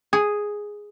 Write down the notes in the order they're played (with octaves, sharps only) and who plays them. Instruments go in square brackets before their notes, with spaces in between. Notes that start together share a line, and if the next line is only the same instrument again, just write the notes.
[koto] G#4